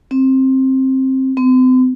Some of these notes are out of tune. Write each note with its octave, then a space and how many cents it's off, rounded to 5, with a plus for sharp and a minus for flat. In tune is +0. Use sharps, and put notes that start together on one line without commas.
C4 +15
C4 -40